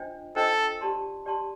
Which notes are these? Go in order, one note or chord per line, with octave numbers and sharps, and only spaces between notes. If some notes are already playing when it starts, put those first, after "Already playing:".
Already playing: D4 F4 C5 D#5 G5
D4 F4 A4 C5 D#5 G5
G4 D5 A5 C6
G4 D5 A5 C6